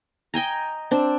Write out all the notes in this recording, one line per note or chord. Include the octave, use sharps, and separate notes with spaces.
D#5 G5 G#5 A#5
C4 D4